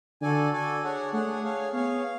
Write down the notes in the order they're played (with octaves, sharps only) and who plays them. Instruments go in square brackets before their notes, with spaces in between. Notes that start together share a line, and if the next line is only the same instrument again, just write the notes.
[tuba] D3 [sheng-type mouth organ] F#4 A4 D5 G#5
[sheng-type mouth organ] F#4 A4 D5 G#5
D4 G#4 C#5 F#5
[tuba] A3 [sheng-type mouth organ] D4 G#4 C#5 F#5
[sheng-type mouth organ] G#4 C#5 F5
[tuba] B3 [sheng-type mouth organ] G#4 C#5 F5
[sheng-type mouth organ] F5